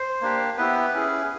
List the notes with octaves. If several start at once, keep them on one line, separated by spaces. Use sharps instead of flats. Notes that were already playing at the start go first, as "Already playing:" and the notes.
Already playing: C5
A#3 D4 G4
B3 E4 G4 B4
C#4 E4 G#4